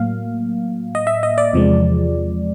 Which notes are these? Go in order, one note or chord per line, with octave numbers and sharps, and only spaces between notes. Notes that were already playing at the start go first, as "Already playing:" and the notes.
Already playing: A2 F#3 A#3 F5
D#5
E5
D#5
D5
E2 C3 F3 G#3